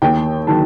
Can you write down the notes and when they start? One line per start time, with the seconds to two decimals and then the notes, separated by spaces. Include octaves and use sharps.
0.02 D#2 G5
0.47 D#3 F#3 A5